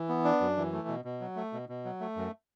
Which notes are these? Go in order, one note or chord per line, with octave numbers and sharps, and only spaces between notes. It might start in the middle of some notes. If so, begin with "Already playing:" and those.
Already playing: E3
B3
D4
F#2
E3
A3
B2
B2
F#3
A3
B2
B2
F#3
A3
F#2